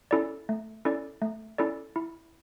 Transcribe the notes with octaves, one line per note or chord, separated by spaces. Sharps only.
C#4 E4 A4 D5
A3
C#4 E4 A4 D5
A3
C#4 E4 A4 D5
E4